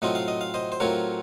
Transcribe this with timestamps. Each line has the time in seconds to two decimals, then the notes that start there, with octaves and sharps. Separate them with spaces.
0.02 A2 F#3 C4 F4 D#5
0.15 F5
0.28 D#5
0.41 F5
0.54 C5 D#5
0.72 C5
0.80 A2 F#3 C4 F4 A#4 C#5